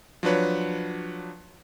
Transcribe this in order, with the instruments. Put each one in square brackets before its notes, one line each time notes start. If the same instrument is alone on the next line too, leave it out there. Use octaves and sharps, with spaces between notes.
[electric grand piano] F3 F#3 D4 B4 C#5